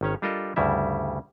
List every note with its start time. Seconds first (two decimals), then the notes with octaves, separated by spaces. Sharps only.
0.01 G#1 D#3 C#4 C#5
0.22 G3 D4 F4 A4 A#4 D#5
0.56 D2 G2 C#3 G3 E4 E5